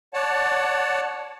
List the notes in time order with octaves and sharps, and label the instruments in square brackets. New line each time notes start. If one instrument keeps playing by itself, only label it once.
[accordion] C#5 D5 F#5 A5